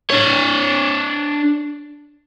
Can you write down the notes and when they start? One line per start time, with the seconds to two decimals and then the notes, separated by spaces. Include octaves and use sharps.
0.11 D4 C#5